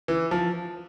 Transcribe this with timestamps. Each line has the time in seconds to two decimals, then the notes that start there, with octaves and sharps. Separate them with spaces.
0.08 E3
0.31 F3